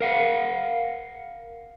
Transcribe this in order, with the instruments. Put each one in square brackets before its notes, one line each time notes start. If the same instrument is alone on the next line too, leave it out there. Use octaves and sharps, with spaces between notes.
[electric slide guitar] A#4 F5 F#5